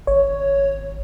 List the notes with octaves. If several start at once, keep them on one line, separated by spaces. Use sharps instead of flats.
G#1 C#5